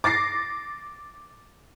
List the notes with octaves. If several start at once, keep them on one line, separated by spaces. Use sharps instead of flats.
D6 A6 A#6 C7